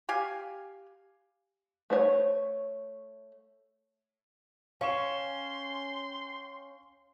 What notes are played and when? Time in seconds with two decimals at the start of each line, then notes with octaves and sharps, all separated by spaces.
0.09 G4 F5 G#5
1.90 A3 C5 C#5
4.81 C#4 F5 G5 C6 C#6 E7